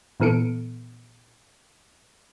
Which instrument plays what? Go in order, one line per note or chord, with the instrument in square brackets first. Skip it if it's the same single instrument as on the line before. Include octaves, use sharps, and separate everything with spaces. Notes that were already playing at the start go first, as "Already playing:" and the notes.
[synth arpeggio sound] A#2 E3 B3 A4 C#7 D7